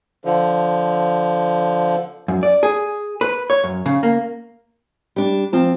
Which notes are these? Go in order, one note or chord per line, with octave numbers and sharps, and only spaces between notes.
D3 F3
F#2
D5
G#4
B4
C#5
F#2
C#3
A#3
G3 D4
F3 C4 A5